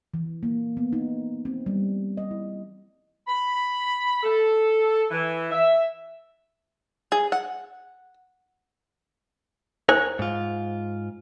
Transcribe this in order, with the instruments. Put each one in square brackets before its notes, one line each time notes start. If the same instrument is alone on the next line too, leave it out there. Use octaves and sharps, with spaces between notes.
[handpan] E3
A#3
B3
D#4
C4
G3
D#5
E4
[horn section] B5
A4
E3
E5
[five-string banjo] G#4
F#5
[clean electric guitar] A#4 C#5 G#5 [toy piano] C5
[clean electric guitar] G#2 F4